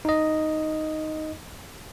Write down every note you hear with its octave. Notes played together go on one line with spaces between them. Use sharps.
D#4 D#5